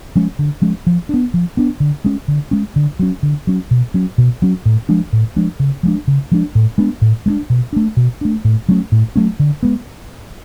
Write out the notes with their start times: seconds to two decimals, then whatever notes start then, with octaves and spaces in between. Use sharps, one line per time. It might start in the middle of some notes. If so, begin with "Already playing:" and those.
0.15 F3 G#3 C#4
0.39 D3
0.62 F3 G#3 C#4
0.87 F3
1.09 B3 D4
1.34 F3
1.57 B3 D4
1.80 D3
2.05 G#3 C#4
2.28 D3
2.51 G#3 C#4
2.76 D3
2.99 F#3 C#4
3.23 D3
3.47 F#3 C#4
3.71 B2
3.94 F#3 C#4
4.18 B2
4.42 F#3 C#4
4.66 A2
4.89 F3 G#3 D4
5.13 A2
5.36 F3 G#3 D4
5.60 C#3
5.83 F3 G#3 D4
6.08 C#3
6.32 F3 G#3 D4
6.55 A2
6.78 G#3 B3 D4
7.02 A2
7.26 G#3 B3 D4
7.50 B2
7.73 A3 D4
7.97 B2
8.21 A3 D4
8.45 A2
8.69 F#3 A3 C#4
8.92 A2
9.16 F#3 A3 C#4
9.40 D3
9.63 G#3 B3